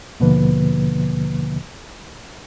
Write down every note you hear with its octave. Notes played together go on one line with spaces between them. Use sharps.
D#2 B2 D3 F3 A#3 B4